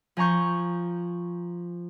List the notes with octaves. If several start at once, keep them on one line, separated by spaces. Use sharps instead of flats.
F3 G#5 A#5 C#6 G6